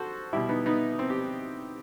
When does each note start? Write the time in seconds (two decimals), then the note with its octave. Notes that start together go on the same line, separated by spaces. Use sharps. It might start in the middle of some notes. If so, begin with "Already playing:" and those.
Already playing: F#4 A4 C5
0.33 B2 G3 E4 G4
0.49 B3 D#4
0.66 B3 D#4
0.99 C4
1.10 G4